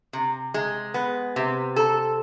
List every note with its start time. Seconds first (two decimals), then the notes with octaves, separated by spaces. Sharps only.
0.13 C3
0.54 G#3
0.94 B3
1.36 C3
1.76 A4